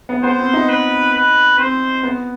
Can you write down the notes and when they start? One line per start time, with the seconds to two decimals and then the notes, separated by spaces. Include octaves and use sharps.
0.09 B3
0.23 B3 C5
0.38 C4
0.53 D#4
0.68 B4
1.13 B4
1.58 C4 C5
2.03 B3